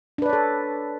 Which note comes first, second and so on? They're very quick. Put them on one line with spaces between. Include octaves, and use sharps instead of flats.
D4 B4 D5 C#5 A4